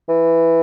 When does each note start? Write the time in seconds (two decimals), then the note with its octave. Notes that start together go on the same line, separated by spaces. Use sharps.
0.09 E3